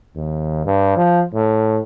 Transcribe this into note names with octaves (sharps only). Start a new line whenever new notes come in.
D#2
G2
F3
A2